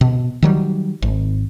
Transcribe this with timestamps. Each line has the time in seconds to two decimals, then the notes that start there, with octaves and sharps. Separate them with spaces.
0.01 B2
0.43 D#3 F#3 G3
1.02 G#1